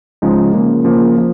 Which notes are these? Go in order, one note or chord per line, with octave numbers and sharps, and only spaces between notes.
C#2 C#3 F3 G#3 D#4
C#3 F3 A#3
C#3 F3 A#3
F3